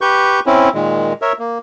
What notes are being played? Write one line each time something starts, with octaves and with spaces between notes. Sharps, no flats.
G4 B4 C#6 G6
C4 C#4 E4
A#2 D#3 G#3
A#4 C#5 E5
A#3